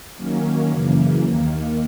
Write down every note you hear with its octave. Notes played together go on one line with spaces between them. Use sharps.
D#3 F#3 A#3 C#4
F#2 C#3 E3 A#3
D#2 D#3 A#3